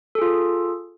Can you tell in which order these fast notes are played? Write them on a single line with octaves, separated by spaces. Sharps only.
A4 G#4 F4